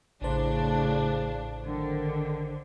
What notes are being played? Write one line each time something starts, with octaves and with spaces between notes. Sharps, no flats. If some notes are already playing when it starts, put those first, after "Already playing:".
A1 A2 C#3 D4 C5
D3 D#3